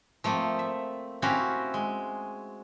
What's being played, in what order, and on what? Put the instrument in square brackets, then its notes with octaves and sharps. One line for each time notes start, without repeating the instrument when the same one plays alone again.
[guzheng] F3 A3 A#3 C4
E5
C4 C#4 E4 F#4 G4 F5
G#3